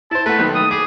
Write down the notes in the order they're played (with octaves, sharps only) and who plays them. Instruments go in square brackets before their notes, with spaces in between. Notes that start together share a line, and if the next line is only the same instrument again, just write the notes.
[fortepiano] E4 C5 [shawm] A5
[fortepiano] A3 F#5 [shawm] B4
[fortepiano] B1 D#3
[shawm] D#6
[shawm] G#4 [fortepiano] D6